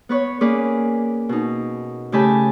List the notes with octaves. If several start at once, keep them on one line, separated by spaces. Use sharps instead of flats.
B3 B4 C#5
A#3 C#4 G#4 B4 D5
B2 D#4
C#3 A3 G4 G#5 A5 B5